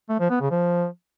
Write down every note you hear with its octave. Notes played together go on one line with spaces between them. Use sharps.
A3
F3
B3
C#3
F3